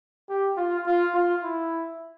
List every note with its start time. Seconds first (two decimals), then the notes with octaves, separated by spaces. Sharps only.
0.29 G4
0.57 F4
0.86 F4
1.14 F4
1.43 E4